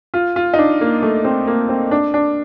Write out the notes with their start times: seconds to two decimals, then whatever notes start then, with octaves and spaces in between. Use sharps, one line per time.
0.14 F4
0.36 F4
0.54 D#4
0.59 D4
0.81 A#3
1.02 A3
1.25 C4
1.47 A#3
1.69 C4
1.91 D4
2.14 D4